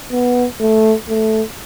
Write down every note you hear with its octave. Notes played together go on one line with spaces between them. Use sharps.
B3
A3
A3